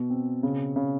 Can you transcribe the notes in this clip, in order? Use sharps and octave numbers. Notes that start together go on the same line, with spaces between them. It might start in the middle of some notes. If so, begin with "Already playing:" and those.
Already playing: B2
C4
C#3
C#3